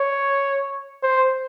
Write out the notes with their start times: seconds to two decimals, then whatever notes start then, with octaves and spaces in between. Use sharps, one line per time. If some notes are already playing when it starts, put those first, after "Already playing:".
Already playing: C#5
1.03 C5